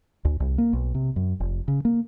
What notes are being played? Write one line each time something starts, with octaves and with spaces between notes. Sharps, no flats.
D2
C2
A#3
B1
C3
F#2
F1
C#3
A#3